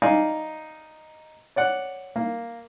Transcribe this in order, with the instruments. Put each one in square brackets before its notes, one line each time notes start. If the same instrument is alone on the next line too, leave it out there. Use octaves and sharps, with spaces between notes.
[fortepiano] D#4 D5 F5 G#5
C#5 D5 F#5
A#3